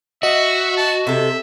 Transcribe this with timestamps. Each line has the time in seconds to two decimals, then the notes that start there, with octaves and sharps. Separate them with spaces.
0.23 F#4 D#5 E5
0.77 A5
1.07 C3 A4 E5